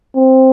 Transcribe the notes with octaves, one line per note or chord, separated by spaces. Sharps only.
C4